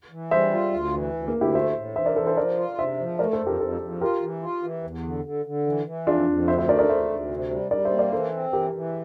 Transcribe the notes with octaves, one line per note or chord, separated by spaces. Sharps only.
E3
G3 C5 E5
F4
D2
E3
D2
A#3
D2
E4 G4
A3 C5 E5
A2
E3 C5 E5
A#4 D5
E3 A4 C5
A4 C5
F3 A#4 D5
F4
C3 C5 E5
F3
A3 A#4 D5
A4 C5
F2
G4 A#4
F2 A4 C5
F2
F4 G4 A#4
E3
F4
E3
E2
D3
D3
D3
E3
E3
F2 D4 F4
F2
D2 C5 E5
C5 E5
A3 A#4 D5
A#4 D5
D2 C5 E5
D2
C3
G3
G3 A#4 D5
C5 E5
A#3
A#4 D5
E3 A4 C5
C4
E3 G4 A#4
E3